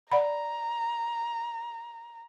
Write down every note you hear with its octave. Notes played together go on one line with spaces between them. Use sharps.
D5 F#5 A#5 B5